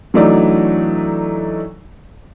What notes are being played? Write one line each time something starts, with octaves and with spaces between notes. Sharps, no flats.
E3 F#3 A3 D4 D#4 D5